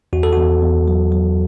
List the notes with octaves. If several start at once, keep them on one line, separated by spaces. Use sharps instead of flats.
E2 F#4
A4
E2 F#4
E2
F#3
F#3